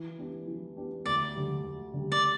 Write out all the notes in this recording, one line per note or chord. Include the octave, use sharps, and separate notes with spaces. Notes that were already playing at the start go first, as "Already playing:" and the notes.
Already playing: E3
B3 D4 G4
E3
B3 D4 G4
D2 D5
D3 G3
D2
D3 G3
D5